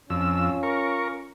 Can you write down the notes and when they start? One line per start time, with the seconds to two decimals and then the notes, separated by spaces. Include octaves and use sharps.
0.10 F2 C#4 F4 E6
0.63 A#4 C#6